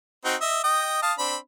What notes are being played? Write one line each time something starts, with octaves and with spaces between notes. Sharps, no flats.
C4 D#4 F#4
D#5 E5
D#5 G5 D#6
F5 A5 D#6
C4 D4 B5